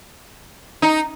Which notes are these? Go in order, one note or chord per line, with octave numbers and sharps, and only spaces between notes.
D#4